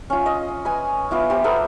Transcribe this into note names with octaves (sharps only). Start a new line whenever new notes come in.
C#4 F4
D#5
B4 G#5
B3 F4 E5 D6
G4 C5
B3 A4 A#4 C5